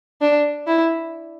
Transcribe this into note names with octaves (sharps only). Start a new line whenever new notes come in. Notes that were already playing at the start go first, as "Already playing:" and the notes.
D4
E4